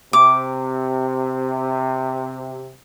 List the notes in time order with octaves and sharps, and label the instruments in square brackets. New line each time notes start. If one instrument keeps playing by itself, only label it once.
[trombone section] C3 [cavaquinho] D6